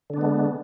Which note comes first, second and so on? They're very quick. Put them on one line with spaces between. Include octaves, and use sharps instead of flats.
D3 D4 B3 G#3